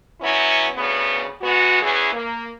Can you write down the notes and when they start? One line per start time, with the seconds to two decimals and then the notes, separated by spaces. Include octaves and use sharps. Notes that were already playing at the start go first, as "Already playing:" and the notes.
0.21 F#3 B3 C#4 E4
0.75 D2 C#3 B3
1.41 G#3 B3 F#4
1.81 E2 E3 C#4 G#4
2.12 A#3